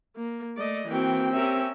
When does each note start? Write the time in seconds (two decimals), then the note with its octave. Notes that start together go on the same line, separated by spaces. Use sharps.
0.16 A#3
0.57 A3 D5 D#5
0.88 E3 A#3 C4 F#4 G5
1.33 C#4 G4 A#4 E5